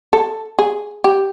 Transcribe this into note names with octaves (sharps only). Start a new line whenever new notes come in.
A4
G#4
G4